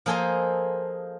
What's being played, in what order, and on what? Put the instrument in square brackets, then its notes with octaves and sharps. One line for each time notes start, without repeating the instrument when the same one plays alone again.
[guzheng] F3 A#3 G#4 A4 C5 D#5